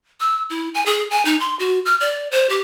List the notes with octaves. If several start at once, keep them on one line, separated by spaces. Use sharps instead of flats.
E6
E4
G#5
G#4
G#5
D#4
C6
F#4
F6
D5
C5
G4